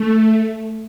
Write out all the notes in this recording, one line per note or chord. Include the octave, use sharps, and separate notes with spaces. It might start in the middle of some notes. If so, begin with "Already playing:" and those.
Already playing: A3